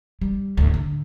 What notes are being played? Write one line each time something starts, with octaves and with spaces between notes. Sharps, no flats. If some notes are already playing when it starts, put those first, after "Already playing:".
G3
D2 A2
D3